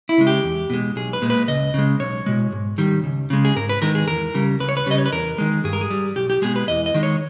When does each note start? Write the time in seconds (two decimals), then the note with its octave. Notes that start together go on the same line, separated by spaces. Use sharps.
0.09 E4
0.18 C#3 G#3
0.27 G4
0.44 E2
0.70 B2 G#3
0.96 B1 G#4
1.13 B4
1.22 A#2 G#3
1.30 B4
1.48 C#2 D#5
1.74 C#3 G#3
2.00 B1 C#5
2.26 B2 G#3
2.52 G#2
2.78 D#3 G3
3.04 C#2
3.30 C#3 G#3
3.45 G#4
3.56 G#2 A#4
3.69 B4
3.82 D#3 G#3 A#4
3.95 G#4
4.08 E2 A#4
4.34 C#3 G3
4.60 C#2 B4
4.69 C#5
4.77 B4
4.86 C#3 G3 D#5
4.98 C#5
5.06 B4
5.12 E2 A#4
5.38 D#3 G#3
5.64 G2 G#4
5.73 A#4
5.81 G#4
5.90 G3
6.16 B1 G4
6.30 G4
6.42 B2 G#3 G#4
6.56 B4
6.68 E2 D#5
6.86 D#5
6.95 D#3 G#3
7.03 C#5